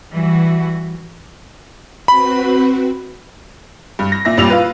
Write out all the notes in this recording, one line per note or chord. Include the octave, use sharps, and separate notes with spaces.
E3 G3 F#4
C4 F#4 B4 B5
G2
A#6
A#2 E5 A#6
A1 A#2 G3 E6 F7
F4 B4